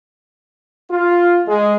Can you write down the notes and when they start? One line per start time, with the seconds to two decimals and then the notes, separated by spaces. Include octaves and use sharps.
0.91 F4
1.47 G#3